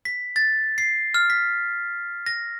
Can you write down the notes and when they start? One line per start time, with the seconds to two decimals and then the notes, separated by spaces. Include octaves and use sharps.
0.05 B6
0.36 A6
0.78 C7
1.14 F6
1.30 B6
2.26 A#6